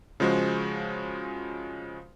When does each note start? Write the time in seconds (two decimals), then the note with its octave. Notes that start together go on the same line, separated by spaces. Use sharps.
0.20 C#3 F3 G#3 F#4 C5